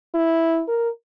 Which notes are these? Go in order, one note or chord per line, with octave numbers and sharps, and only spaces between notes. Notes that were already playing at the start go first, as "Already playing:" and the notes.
E4
A#4